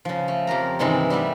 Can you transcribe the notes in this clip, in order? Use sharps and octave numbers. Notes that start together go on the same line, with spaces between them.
C#3 F3
A3
F2 G4 A#4 A#5
G2 C3 D#3 E3 G#3 C4
G3 A3 B3 E5